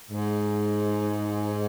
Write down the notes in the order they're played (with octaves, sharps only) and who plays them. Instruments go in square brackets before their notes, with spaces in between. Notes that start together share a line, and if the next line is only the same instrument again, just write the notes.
[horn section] G#2